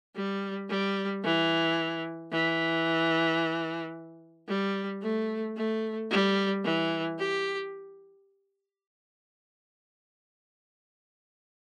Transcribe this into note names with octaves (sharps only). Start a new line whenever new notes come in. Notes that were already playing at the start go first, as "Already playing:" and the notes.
G3
G3
E3
E3
G3
A3
A3
G3
E3
G4